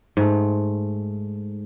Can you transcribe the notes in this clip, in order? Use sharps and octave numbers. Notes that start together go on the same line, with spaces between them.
G#2 A3